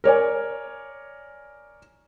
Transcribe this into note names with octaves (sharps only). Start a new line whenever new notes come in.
A#4 C#5 D5 G#5